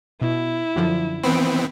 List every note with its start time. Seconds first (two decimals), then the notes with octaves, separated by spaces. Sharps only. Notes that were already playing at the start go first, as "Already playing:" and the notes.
0.22 B2 E4
0.76 F#2 D3 F3
1.24 E3 B3 C4 B5 D7